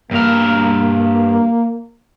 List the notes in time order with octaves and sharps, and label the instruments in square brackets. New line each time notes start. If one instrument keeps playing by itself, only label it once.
[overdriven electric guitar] G2 A#4 [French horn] A#3